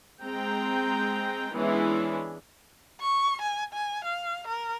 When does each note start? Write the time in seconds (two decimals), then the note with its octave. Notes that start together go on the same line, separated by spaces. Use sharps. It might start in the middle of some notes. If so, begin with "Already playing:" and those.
0.22 G#3 C4 G5 A#5
1.54 E3 G#3 B3 C#4 D4 E4
3.00 C#6
3.42 G#5
3.73 G#5
4.04 F5
4.47 A#4